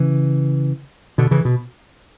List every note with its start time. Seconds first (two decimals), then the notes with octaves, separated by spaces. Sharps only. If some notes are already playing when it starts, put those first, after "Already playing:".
Already playing: C#3 E3
1.18 B2 D3
1.31 C#3 E3
1.45 B2